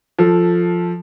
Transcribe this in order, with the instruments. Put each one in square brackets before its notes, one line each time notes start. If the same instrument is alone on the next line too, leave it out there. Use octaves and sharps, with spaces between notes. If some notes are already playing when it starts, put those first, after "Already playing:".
[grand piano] F3 A4